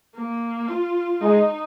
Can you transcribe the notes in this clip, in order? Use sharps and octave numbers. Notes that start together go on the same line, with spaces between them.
A#3
F4
G#3 D#4